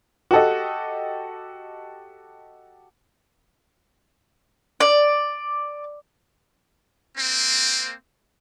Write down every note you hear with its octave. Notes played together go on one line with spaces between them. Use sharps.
F#4 G4 A4 D#5
D5
A#3 C4